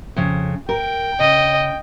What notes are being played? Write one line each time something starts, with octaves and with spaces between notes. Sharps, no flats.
F2 C#3
A#4 G5
C#3 D#5